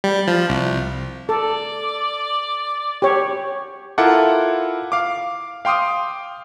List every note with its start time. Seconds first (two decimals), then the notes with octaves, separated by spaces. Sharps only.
0.04 G3
0.28 F3
0.50 C2
1.29 A4 D5
3.02 G4 C#5
3.98 E4 F4 A4 A#4 F#5 D6
4.92 F5 D6
5.65 F5 G5 C6 D6 D#6